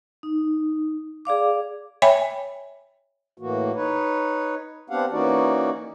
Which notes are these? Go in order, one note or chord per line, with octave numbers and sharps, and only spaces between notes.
D#4
G#4 D5 F5 D6
C#5 E5 G5 G#5 B5
A2 E3 A#3 F#4
D#4 B4 C#5
B3 C4 D4 G4 F5 F#5
E3 A#3 C#4 D#4 F#4 D5